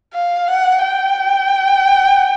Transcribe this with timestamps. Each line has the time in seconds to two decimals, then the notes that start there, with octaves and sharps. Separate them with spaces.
0.14 F5
0.48 F#5
0.82 G5